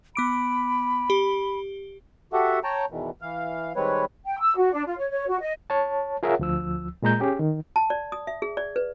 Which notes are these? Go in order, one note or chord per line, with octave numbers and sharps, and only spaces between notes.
B3 B5 D6 D7
G4
F#4 G4 A4 E5 F#5
C#5 G5 A5 A#5
E2 B2 D#3 E3
E3 F5
D#3 G3 G#3 C4 B4 C#5
G5
E6
F#4
D4
F4
C#5
C#5
F#4
D#5
C#5 A5
F4 G#4 A#4 C#5 E5 F#5
D2 F3 E6
A#2 G#3 A#5 G6
C#4 G4 G#4
D#3
A5
D5
D#6
E5
G#4
D5
B4